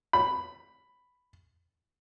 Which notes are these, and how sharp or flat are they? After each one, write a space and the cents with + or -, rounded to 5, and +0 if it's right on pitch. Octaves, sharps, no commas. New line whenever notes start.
B5 +5